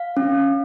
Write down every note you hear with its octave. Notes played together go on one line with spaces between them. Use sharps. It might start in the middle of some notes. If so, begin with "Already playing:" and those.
Already playing: F5
C#4